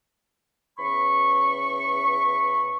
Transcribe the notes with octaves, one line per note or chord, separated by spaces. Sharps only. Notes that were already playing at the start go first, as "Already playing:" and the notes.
E2 C#4 B5 C#6